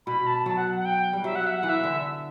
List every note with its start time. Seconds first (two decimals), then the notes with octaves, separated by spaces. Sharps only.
0.06 B2 B5
0.27 A5
0.46 F#3 A5
0.56 F#5
0.76 F#5
0.85 G5
1.13 G3
1.24 F#3 E5
1.35 F#5
1.47 E5
1.57 F#5
1.63 E3
1.69 E5
1.83 D3